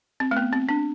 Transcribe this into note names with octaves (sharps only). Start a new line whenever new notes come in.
C4
A3
B3
C4
D4